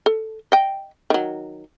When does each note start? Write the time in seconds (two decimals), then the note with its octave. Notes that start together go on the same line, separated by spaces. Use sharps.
0.06 A4
0.52 D#5 G5
1.10 D#3 F#3